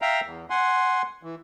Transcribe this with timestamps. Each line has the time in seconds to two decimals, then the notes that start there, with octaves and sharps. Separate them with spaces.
0.02 E5 F5 G5 A#5
0.24 E2
0.50 F#5 G#5 C6
1.23 E3